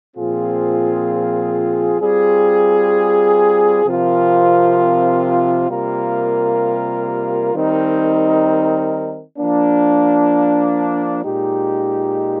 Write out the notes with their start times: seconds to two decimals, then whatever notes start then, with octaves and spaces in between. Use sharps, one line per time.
0.14 A#2 F3 C4 F4 G#4
1.99 G3 C4 F4 G#4
3.83 C3 F3 C4 F4 A#4
5.68 C3 G3 A#3 F4 A#4
7.53 D#3 G3 C4 D#4 A#4
9.38 F3 A#3 D4
11.23 A#2 G#3 D#4 G4